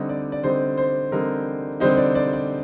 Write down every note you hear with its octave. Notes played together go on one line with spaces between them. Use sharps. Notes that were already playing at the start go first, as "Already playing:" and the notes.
Already playing: D3 G3 C4 D#4 D#5
D5
D5
D3 G3 C4 D#4 C5
C5
D3 G3 C4 D#4 A#4
D3 G3 C4 D#4 C5
D5
D5
D5